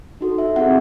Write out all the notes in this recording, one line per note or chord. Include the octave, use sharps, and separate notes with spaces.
D#4 F#4 A4
E5
C4 E4 G#4 F#5